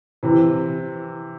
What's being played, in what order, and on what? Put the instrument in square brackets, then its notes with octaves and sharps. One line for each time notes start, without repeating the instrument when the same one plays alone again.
[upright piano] C3 E3